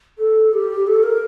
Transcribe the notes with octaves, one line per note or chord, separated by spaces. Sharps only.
A4
G4
A4
A#4